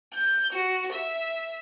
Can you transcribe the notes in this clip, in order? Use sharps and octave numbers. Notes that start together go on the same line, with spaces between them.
G6
F#4
E5